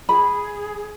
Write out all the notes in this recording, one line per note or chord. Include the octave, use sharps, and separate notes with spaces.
G#4 B5